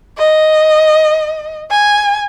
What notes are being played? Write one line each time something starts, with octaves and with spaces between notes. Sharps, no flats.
D#5
G#5